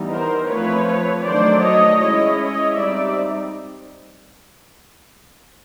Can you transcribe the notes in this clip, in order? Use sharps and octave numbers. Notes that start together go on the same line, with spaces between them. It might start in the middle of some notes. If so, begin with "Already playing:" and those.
Already playing: E3 G3 B3 D#4
A#4 C5
F3 A3 C4 B4 C#5
D#3 F#3 A3 D4 C5 D5
C#5 D#5
G#3 C#4 E4 C#5 D#5
C#5 D#5
G3 C4 D#4 D5 E5